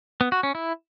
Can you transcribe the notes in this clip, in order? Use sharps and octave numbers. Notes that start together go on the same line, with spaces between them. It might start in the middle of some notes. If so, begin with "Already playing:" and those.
B3
F#4
C#4
E4